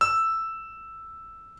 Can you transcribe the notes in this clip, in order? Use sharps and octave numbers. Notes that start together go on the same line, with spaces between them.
E6